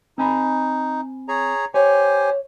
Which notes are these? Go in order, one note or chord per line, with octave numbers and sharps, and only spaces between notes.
C4 D#4 G#5 B5
G#4 C#5 A#5
G4 C5 C#5 G#5